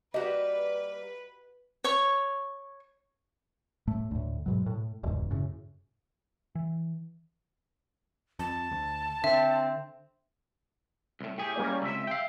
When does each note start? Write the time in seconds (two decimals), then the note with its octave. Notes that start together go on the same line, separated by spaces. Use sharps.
0.14 G3 A#3 F#4 G4 B4 D#5
1.84 C#5 C#6
3.87 A2 A3
4.11 D2 A2
4.46 G#2 B2 F#3
4.66 A2
5.03 E1 C#2 G#2
5.31 F#2 A2 C#3
6.55 E3
8.39 F2 A5
8.72 D2
9.24 D3 C4 E5
11.21 C2 A2
11.38 A2 G4 G#4
11.56 G3 A#3 C#4
11.82 C#2 C3 E5
12.07 F5 G5